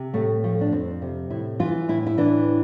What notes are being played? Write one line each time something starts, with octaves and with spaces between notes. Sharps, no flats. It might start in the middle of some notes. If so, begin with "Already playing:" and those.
Already playing: C3
A2 A3
F3 A3
D4
F2 C4
C3
A2 E4
E3 F4
A2 E4
E4
E3 D4